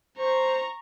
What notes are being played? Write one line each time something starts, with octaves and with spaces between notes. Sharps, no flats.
C5 A#5 C#6